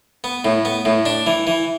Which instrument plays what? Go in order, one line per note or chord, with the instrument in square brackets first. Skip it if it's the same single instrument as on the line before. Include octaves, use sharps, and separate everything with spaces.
[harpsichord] B3
A2
B3
A2
D4
E3
E3